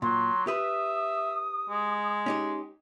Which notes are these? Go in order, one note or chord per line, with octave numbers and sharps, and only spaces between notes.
A#2 F#3 C6
G4 B4 E5 D#6
G#3
C#4 D#4 G4